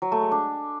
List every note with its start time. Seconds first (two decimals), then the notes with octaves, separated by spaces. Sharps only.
0.02 F#3
0.12 A3
0.22 G#3
0.31 D4